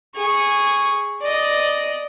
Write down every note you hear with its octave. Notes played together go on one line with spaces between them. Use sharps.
G#4 C#6
D5 D#5